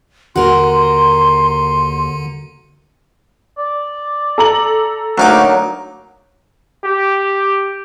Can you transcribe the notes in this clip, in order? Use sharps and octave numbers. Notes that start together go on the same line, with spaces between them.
D#2 D3 F#4 A#4 C6
D5
A4 A#5 F#7
D2 F#3 A#3 D#4 D6
G4